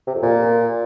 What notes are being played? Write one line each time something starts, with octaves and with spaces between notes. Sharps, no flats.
C3
F2
A#2